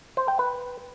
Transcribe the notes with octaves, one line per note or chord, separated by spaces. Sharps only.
C5
G5
B4